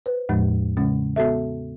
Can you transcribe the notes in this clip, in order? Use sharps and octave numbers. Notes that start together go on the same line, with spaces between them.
B4 C5
E2 A2 F3 G#3
C#3 G#3 C#4
B3 F#4 A4 E5